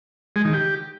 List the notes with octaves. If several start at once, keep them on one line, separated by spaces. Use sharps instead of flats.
G#3
D#3
G4